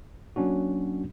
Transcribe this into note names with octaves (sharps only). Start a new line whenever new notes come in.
F#3 A#3 C#4 D4 F#4